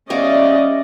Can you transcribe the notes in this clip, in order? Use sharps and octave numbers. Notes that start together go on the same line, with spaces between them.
E2 G3 C#4 D5 D#5 F5